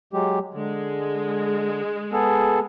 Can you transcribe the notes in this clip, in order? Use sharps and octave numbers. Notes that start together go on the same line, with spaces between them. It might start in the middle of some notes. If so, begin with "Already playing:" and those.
F#3 G#3 G4
D3 G#3
B3 G#4 A4